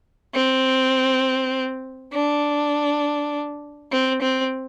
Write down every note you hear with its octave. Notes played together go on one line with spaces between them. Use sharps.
C4
D4
C4
C4